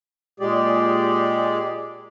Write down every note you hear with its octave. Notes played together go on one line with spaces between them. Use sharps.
A#2 G#3 G4 G#4 D5